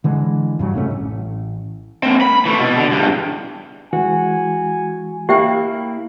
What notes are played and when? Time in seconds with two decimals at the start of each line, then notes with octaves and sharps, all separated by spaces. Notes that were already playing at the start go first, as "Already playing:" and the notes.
0.04 D3 E3 G#3
0.59 G2 C#3 F#3
0.74 F1 G#2 A3 C#4
0.91 A1
2.03 A#3 C4
2.21 B5
2.46 E3 A3
2.60 B2
2.76 D3
2.92 E2 G2
3.93 E3 G#3 F#4 G#5
5.29 A#3 E4 G4 E5 F5 G5